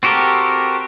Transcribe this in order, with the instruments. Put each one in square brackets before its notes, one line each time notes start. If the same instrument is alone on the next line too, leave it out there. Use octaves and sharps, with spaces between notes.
[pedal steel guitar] C4 F#4 G4 A4 A#4